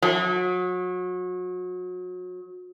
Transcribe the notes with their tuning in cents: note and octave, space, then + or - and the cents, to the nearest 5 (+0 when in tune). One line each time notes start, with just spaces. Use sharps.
F#3 -30